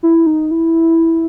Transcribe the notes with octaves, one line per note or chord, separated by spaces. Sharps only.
E4
D#4
E4